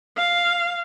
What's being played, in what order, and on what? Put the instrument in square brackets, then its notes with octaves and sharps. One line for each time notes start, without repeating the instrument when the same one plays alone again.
[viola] F5